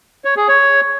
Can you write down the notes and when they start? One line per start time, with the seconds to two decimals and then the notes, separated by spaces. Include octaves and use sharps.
0.25 C#5
0.37 G#4
0.48 C#5